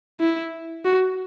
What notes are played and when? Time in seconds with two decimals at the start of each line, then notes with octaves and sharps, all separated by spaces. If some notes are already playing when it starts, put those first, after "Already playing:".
0.20 E4
0.85 F#4